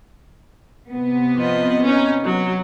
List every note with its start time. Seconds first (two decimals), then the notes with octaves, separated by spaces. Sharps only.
0.89 C3 B3
1.37 F3 D#5
1.82 C#4 D#4
2.24 F#3